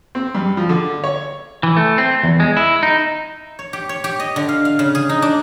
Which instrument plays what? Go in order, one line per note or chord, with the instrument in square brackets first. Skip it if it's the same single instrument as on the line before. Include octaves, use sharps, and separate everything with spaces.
[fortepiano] C4
G2
F3
D3
C#5
[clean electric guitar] E3
A3
C4
E2
G#3
E4
D#4
[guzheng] C#5
G4
C#5
G4
D#5
D3
F5
F5
C#3
G#4
D#4
D4